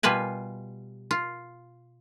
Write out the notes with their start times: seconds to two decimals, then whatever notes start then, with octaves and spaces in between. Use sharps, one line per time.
0.03 B2 G3 F4 B4 G#5
1.11 F4